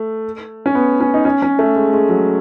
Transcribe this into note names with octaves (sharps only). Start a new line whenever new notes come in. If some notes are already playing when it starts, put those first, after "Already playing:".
Already playing: A3
C#4
B3
C#4
D#4
C#4
C#4
A3
G#3
G#3
F#3